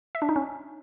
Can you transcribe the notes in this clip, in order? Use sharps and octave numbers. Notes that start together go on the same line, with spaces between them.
E5
D4
D#4
C#4